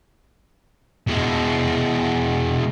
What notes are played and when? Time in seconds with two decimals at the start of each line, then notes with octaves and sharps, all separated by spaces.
1.07 B2 G#3